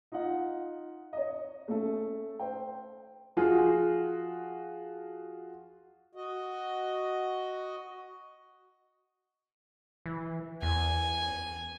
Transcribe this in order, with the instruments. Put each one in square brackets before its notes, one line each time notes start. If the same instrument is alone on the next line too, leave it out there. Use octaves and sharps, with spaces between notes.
[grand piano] D#4 F4 D#5 F#5
C#5 D#5
A3 C#4 A4
C5 G5
[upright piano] F3 F4 F#4 G#4
[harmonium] F#4 D#5
[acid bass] E3
[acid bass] E2 [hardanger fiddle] G#5